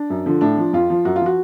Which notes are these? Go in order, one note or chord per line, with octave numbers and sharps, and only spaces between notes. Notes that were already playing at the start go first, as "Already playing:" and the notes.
Already playing: D4
F#2
D3 F3
A2 D4
F3
F2 F4
F3
F#2 F#4
F4
F3 F#4